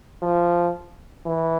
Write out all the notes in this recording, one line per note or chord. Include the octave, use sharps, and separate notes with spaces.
F3
E3